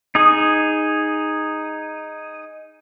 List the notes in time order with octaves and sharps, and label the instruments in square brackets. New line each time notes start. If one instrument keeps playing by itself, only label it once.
[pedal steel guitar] D#4 G#4 D#6